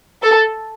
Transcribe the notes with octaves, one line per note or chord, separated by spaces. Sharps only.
A4